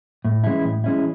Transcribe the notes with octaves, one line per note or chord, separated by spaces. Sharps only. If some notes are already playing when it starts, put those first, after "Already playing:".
A2
E3 G#3 C#4 E4
A2
E3 G#3 C#4 E4